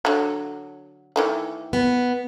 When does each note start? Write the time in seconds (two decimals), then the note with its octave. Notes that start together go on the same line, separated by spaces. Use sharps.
0.05 D3 F#3
1.16 D#3 E3 A3
1.73 B3